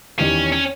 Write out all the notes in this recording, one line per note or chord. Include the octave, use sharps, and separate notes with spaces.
E2 D#3 G3 C#4
C#4